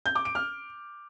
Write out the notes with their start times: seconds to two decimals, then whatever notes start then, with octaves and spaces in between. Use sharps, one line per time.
0.06 G6
0.15 D6
0.25 D7
0.35 F6